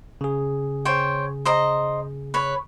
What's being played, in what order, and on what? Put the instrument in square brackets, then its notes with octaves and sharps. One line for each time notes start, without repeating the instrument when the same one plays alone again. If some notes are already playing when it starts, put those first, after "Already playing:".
[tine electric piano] C#3 G#4
[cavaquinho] C5 C#5 G5
C5 D#5 A#5
B4 C#5